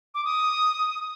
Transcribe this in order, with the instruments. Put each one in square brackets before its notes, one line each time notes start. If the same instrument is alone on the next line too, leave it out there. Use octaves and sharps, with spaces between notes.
[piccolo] D6
D#6